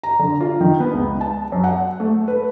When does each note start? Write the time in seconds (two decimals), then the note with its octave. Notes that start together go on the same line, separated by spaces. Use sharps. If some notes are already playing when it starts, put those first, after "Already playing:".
0.03 A#5
0.19 D3
0.41 F4
0.61 D#3
0.80 B3
0.93 C#2
1.21 A5
1.52 F#2
1.64 F#5
2.00 A3
2.28 B4